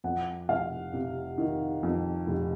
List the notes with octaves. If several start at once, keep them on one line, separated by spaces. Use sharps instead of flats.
F2 F#5
F1 F5
C3
D#3
F2
F1